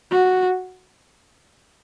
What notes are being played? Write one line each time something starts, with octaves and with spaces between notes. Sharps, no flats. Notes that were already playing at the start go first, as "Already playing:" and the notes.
F#4